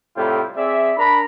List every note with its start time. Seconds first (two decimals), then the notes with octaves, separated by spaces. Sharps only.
0.16 A2 C3 G3 E4 F4 G5
0.56 C4 G#4 D5 E5
0.97 D4 A#4 A#5 B5